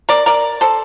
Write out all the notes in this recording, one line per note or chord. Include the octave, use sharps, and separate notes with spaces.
A#4 D5
A#4 D5
A4 C5